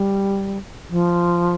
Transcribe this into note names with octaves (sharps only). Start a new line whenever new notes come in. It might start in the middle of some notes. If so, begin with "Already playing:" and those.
Already playing: G3
F3